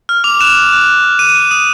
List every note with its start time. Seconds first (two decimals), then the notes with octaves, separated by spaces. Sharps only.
0.09 F6
0.24 D6 F7
0.41 F#6 E7
0.56 D6
0.72 F#6
0.87 D6
1.04 F6
1.19 D6 D#7
1.35 F6
1.51 D#6 D#7